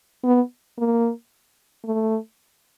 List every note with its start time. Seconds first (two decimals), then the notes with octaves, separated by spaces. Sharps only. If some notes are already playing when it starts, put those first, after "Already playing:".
0.24 B3
0.78 A#3
1.84 A3